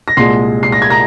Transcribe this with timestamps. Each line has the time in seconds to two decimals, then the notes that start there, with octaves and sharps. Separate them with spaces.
0.08 A#6
0.17 C2 A#2 G#3 C6 C7
0.63 C7
0.72 A#6
0.82 G#6
0.90 A#5 A#6